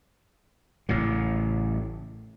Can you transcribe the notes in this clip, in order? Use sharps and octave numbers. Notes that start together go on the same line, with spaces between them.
A1 A2 C#3